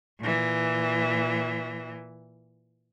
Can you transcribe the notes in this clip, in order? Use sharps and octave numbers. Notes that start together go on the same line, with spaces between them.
A#2 E3